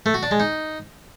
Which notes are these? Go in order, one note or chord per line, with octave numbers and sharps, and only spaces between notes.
A3
F#4
D4
G#3
D#4